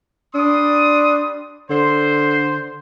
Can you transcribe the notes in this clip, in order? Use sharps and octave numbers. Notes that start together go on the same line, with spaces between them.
G3 D4 C6 D#6
D3 C5